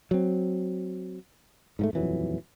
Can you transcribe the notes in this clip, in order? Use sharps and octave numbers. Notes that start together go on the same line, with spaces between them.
F#3 C4
G#2 F3 A3
D#1 F2 E3 F#3